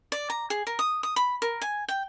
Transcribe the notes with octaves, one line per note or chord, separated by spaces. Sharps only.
D5
A#5
G#4
A#4
D#6
D#6
B5
A#4
G#5
G5